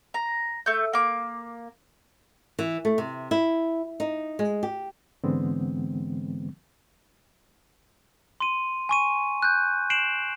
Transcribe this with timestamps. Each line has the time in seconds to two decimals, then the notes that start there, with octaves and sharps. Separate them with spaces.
0.14 A#5
0.66 A3 G6
0.93 A#3 D6
2.59 E3
2.85 A3
2.98 C3
3.31 E4
4.00 D#4
4.39 G#3
4.63 G4
5.24 G#2 D3 E3 G#3 B3 C4
8.40 C6 D#7
8.89 G#5 C#6 D#7
9.42 F#6 G6
9.90 C7 D7 E7 F#7